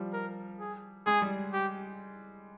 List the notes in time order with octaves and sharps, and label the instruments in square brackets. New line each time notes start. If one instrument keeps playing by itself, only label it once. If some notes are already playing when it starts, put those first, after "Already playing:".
Already playing: [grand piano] F3 G3
[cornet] A#4
G#4
[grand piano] G#3 [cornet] G#4
[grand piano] G3
[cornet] G4